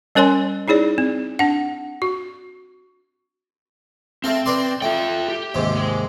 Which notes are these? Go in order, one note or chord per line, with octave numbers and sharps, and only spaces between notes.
G3 C#4 A#4 C#5 G#5 C6
D#4 E4 G#4 C#5 D5
C4
D4 F#5
F#4
A3 C4 A4 F5
B4 D5 C6
A3 F4 G5
G4
D#2 G#2 C3
G#3